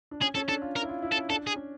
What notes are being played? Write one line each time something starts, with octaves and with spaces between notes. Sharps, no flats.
D4
C#4 G#4
C#4 A4
D4 A4
F4
A#4
E4
F4
E4
A4
C#4
D4 A4
G#4
C#4